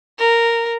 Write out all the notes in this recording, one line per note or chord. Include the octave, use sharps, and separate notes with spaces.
A#4